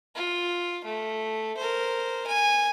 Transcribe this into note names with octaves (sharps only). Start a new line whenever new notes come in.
F4
A3
A#4 C5
G#5